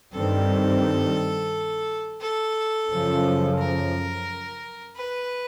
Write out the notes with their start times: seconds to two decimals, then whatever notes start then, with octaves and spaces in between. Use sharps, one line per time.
0.13 G2 D#3 G3 C4 A4
2.21 A4
2.89 F#2 C#3 F3
3.58 A#4
4.96 B4